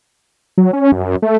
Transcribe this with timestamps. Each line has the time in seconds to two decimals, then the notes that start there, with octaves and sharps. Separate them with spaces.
0.58 F#3
0.73 C#4
0.92 F#2
1.22 A3